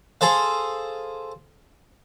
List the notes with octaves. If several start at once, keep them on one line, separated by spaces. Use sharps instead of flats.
G#4 A4 C5 F5